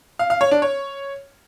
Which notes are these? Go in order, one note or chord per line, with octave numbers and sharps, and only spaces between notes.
F5
F5
C#5
D4
C#5